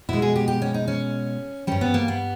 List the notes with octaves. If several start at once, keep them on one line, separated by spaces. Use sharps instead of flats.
B2 G#3 E4
G#4
G4
G4
C#4
D#4
C#4
G2 G3 C#4
B3
A#3
B3